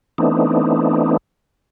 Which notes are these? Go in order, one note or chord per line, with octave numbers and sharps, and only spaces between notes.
E3 A3 B3 C4 D4 D#4